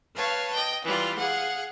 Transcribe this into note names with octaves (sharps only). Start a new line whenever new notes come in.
B4 C#5 F5 A5
D#5 G5
E3 G3 F4 B4
G#4 F5 F#5